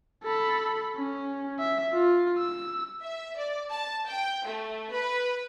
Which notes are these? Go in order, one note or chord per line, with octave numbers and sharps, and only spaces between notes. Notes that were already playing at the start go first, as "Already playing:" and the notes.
A4 B5
C#4
E5
F4
E6
E5
D5
A5
G5
A3
B4